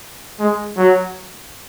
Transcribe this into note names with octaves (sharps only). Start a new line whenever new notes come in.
G#3
F#3